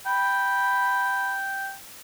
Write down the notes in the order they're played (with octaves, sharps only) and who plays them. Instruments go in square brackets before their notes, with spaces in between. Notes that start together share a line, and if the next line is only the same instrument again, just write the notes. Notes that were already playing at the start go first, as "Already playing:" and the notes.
[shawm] G5 [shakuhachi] B5